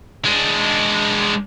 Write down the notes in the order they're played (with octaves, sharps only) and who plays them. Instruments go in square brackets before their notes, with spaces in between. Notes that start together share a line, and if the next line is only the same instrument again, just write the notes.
[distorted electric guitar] G#3 D4